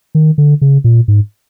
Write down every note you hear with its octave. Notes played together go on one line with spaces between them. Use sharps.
D#3
D3
C#3
A#2
G#2